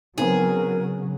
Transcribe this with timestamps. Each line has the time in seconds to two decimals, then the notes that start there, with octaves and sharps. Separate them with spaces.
0.18 C#3 F#3 B3 C4 D#4 G#4 A#4